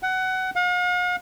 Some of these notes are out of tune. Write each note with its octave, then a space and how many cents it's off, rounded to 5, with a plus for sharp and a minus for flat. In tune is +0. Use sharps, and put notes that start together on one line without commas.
F#5 +20
F5 +45